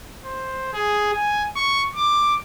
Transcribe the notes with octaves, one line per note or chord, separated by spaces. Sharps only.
C5
G#4
G#5
C#6
D6